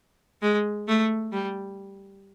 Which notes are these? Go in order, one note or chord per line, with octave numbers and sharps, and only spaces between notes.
G#3
A3
G3